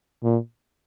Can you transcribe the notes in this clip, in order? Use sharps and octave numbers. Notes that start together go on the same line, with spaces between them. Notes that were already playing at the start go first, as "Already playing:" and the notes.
A#2